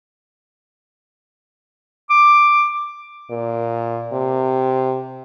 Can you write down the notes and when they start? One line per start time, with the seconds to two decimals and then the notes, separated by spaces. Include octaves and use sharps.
2.10 D6
3.30 A#2
4.13 C3